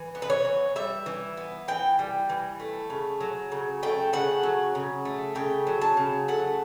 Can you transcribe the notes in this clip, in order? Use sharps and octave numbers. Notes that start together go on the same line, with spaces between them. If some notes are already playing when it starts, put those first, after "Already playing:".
Already playing: E3
B3
B4
C#5
E3
G3 E5
E3
B3
E3 G5
G3
E3
A3
C#3
F#3
C#3
A3 G5
C#3 F#5
F#3
C#3
A3
C#3 G5
F#3
A5
C#3
A3 F#5